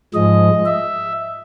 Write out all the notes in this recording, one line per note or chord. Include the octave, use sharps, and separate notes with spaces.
G#2 F3 G#3 D#5
E5